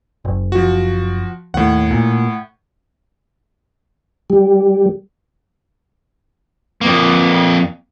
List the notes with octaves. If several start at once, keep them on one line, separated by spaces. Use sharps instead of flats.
F#1
F3 F#4
D#2 A2 F#5
A#2
G3
F2 A#3